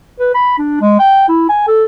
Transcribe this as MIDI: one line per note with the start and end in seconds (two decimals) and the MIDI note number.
0.19 0.30 71
0.34 0.54 83
0.58 0.78 62
0.81 0.96 56
0.99 1.28 79
1.28 1.45 64
1.49 1.64 80
1.67 1.85 69